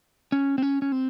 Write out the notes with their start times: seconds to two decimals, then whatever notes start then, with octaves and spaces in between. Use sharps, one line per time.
0.32 C#4
0.58 C4
0.62 C#4
0.82 C#4
0.92 C4